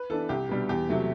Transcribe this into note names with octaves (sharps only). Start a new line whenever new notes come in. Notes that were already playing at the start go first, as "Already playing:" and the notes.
Already playing: B4
E3 B3 D4 A4
C2 G4
B2 G3 D4
E2 G4
C3 F#3 A3